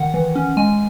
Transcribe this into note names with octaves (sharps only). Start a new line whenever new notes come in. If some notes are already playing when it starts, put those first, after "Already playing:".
Already playing: D#3 F#5
E3
C#4
G#3 G#5